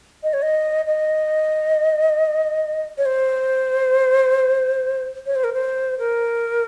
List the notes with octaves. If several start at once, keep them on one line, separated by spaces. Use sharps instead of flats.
D#5
C#5
D#5
D#5
C#5
C5
C#5
C5
A#4
C5
A#4